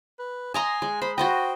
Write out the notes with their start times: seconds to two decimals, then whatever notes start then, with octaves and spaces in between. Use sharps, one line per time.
0.19 B4
0.54 D#5 G#5 A#5 C6
0.82 G#3
1.02 C5 B5
1.18 F#4 C5 D#5 G5